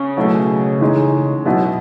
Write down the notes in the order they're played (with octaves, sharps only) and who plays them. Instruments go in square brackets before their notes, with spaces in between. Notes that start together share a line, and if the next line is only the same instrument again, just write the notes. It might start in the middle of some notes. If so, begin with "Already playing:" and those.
Already playing: [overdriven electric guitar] C#3
[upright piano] B2 F#3 A3 E4
E3 G#3 D#4
B2 F#3 B3 E4